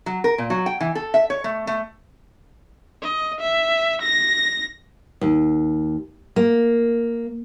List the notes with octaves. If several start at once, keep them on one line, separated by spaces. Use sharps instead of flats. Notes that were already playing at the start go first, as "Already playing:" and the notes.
F#3
A#4
A#2
F#3
G5
E3
A4
E5
C#5
A3
A3
D#5
E5
A#6
D#2
A#3